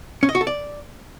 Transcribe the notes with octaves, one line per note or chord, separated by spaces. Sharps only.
C#4
D#5
F#4
A4
D5